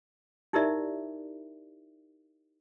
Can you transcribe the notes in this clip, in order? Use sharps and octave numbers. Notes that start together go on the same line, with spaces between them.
D#4 E4 G4 A#4 D5 E5